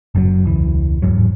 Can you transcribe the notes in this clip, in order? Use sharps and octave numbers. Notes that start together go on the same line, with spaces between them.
F#1 F#2 D3 F#3
E1 C#2 E3
D1 E2 G#2 F#3